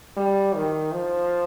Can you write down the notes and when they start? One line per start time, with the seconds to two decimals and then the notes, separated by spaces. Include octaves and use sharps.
0.17 G3
0.55 D#3
0.92 F3